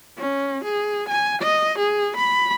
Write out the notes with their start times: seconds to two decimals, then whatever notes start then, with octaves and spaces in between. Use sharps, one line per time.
0.17 C#4
0.64 G#4
1.08 G#5
1.41 D#5
1.78 G#4
2.16 B5